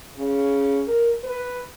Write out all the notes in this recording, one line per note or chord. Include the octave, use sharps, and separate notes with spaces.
C#3
A#4
B4